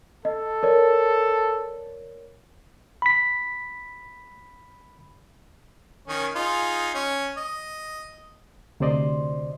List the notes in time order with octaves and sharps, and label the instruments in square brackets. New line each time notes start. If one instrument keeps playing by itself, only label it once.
[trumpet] A4 [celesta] D#5
[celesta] A#4 C#5 D5
[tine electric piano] B5 B6
[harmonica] D#3 C#4
D#4 F4 G#4
C#4
D#5
[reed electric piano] D2 C3 C5 D5 D#5 C6